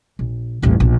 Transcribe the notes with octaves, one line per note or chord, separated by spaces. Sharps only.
A#1
D#1 A1
A#1